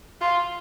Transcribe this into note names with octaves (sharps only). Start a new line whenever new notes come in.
F4